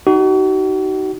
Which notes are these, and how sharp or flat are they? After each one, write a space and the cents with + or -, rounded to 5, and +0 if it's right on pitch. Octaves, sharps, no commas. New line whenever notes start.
D#4 +0 F#4 +40